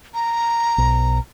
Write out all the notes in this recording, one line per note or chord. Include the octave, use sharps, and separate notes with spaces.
A#5
B1